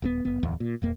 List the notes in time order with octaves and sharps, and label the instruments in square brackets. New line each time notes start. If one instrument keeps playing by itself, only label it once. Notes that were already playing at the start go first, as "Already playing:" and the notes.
[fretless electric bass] D#1 G#2 B3
F#1 B3
D1 E2
A#2
D#1 E2 A#3